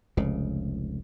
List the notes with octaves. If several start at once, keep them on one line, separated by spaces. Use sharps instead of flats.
F1 C#2 C#3